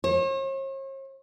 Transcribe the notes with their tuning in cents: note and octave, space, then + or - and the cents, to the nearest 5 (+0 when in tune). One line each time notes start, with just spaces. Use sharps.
C#5 -45